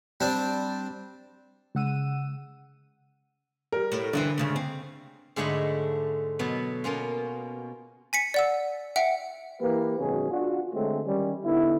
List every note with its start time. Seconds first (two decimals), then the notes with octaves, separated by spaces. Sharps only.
0.20 G3 C4 D4
1.75 C#3 G#3 F#5 E6 D#7
3.72 G3 A#4
3.92 A2
4.13 G2 D3 E3 C5
4.38 G#2 C#3 A3
4.56 C4
5.36 G#2 D3 A3 C#5 D#5 B5
6.39 B2 F#3 B3
6.84 B2 A#3 C#4 F4
8.13 G#5 B6 C#7
8.34 D5 F#5 E6
8.96 E5 F#5 G5 C#7
9.60 E3 A#3 G4 B4
9.98 G#1 F#2 B2 D#3 C#4 G#4
10.30 D4 F4 F#4
10.72 D3 G#3 A3 C4 C#4
11.05 D#3 G3 C#4
11.43 D3 B3 D#4 E4